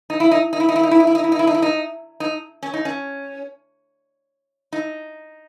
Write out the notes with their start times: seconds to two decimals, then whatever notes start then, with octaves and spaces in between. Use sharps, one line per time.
0.10 D#4
0.20 E4
0.31 D#4
0.53 D#4
0.60 E4
0.69 D#4
0.76 E4
0.83 D#4
0.91 E4
1.00 D#4
1.07 E4
1.15 D#4
1.24 E4
1.32 D#4
1.39 E4
1.47 D#4
1.54 E4
1.62 D#4
2.20 D#4
2.63 C#4
2.74 D#4
2.85 C#4
4.73 D#4